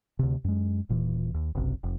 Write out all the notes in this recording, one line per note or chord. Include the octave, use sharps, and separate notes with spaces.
D2 C3
F#2 G#3
D#1 A#2 E3
D#2
F#1 B1 C3
F1